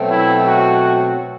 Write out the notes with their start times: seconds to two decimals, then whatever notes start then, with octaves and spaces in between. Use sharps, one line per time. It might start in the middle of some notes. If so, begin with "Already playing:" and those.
Already playing: B2 F#3 A3 C4
0.10 E4
0.45 F#4